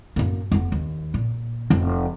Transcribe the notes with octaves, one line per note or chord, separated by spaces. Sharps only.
F#2 A#3
F1 B3
D#2
A#2
F1 C4